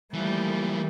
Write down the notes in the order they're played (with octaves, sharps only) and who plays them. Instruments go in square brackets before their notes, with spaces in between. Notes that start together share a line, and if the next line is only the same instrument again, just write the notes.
[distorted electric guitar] E3 F3 [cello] G3 [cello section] A3 A#3